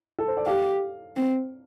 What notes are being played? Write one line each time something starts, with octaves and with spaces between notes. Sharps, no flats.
A4
C5
D5
G4 F5
C4